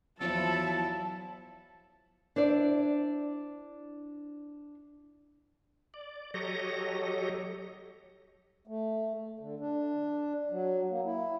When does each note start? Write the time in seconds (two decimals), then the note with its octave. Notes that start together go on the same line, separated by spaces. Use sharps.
0.20 E2 F3 F#3 E4 A4 A5
2.36 D4 E4 C5 D5
5.94 D5
6.34 F#3 G4 A4 C#5 D#5 A#6
8.67 A3
9.40 D3
9.60 D4
10.51 F#3
10.91 A#3
11.05 E4